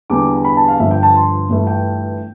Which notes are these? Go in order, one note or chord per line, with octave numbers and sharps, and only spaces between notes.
E2 D3 G3 D6
B5
A5
F5
G1 G2 D3 F3 E5
G5
A5
C6
G1 G2 E3 A3
G5